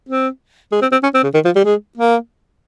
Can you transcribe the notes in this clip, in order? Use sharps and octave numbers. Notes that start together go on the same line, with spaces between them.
C4
G#3
C4
C4
C#4
C4
C#3
D#3
F3
G3
G#3
A#3